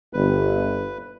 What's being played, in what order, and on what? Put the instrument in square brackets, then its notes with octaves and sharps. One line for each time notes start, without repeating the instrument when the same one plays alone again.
[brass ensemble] G1 [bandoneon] B4